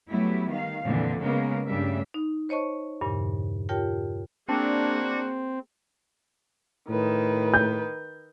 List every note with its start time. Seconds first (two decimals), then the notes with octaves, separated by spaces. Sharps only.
0.10 F#3 G3 A3 B3 E4
0.52 D#3 F5
0.85 F2 A#2 D3 E3
1.22 C#3 G#3 A#3 B3 A#4
1.68 G2 C#3 G3 A3 D4 E5
2.14 D#4
2.49 C5 C#5 D#5 A5 C#6
3.01 E2 G2 A#2 C#3 E3
3.69 F4 G4 A#4 C#5 G5 A5
4.49 A#3 C4 D4 F#4 G#4
6.89 A2 D#3 B4
7.54 G6